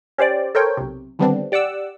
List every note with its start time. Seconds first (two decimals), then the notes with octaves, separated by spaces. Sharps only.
0.18 C#4 G4 C5 D5
0.55 A4 A#4 C5 C#5 G5
0.77 B1 C3
1.19 D3 D#3 G3 B3 C4 D4
1.52 G4 D5 F#5 D6 E6